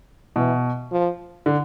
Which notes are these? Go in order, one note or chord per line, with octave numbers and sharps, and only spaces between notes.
B2 E3
F3
D3